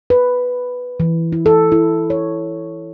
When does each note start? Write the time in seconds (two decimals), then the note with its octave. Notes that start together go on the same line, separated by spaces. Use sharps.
0.10 B4
1.00 E3
1.32 E4
1.46 A4
1.72 E4
2.10 C#5